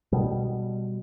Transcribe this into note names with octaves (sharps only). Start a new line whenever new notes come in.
B2 G3